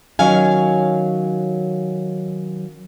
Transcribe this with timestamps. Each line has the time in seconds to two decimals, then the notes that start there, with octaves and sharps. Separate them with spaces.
0.19 D#3 F#3 C#4 F5 G#5